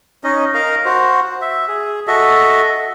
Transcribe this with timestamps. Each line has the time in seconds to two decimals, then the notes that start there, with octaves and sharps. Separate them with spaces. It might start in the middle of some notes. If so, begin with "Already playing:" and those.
0.24 C#4 D#4 D#5
0.54 A#4 D#5 F5 A#5
0.85 F#4 C5
1.42 E5
1.68 G#4
2.07 F#4 A4 D#5 E5